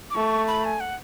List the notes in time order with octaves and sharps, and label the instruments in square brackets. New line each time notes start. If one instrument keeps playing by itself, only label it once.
[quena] D6
[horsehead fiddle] A3 [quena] C#6
[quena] B5
G#5
F#5